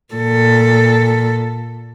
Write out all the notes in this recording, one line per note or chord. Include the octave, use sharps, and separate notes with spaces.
A#2 A4